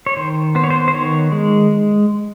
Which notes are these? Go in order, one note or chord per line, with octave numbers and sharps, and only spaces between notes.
C#5
D#3 C5
B3 C5
C#5
C5
C5
D#3 C#5
G#3